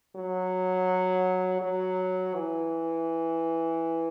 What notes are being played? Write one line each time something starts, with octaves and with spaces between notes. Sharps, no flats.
F#3
F#3
E3